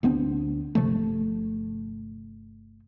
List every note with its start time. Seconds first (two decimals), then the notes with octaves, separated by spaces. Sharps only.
0.03 D2 B3 C4 D4
0.75 G1 C3 F3 A3